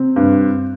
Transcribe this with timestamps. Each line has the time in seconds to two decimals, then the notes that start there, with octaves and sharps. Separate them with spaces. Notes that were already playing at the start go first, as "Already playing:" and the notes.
Already playing: C3 C4
0.16 G2